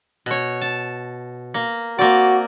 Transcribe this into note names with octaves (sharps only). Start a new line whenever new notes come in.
B2 C#5
A5
A#3
A#3 C4 F#4 D5